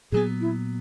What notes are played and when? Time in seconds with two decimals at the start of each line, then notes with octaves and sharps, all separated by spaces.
0.12 A#2 F#3 B3 G#4
0.41 E4